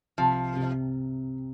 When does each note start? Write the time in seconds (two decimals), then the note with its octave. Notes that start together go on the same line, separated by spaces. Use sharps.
0.18 C2 F3
0.56 C3